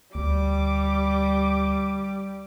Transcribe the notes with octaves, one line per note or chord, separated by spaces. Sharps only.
D2 G3 D6